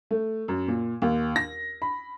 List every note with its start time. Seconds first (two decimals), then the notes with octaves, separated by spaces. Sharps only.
0.11 A3
0.48 F#2
0.68 A#2
1.02 D#2
1.36 A#6
1.82 B5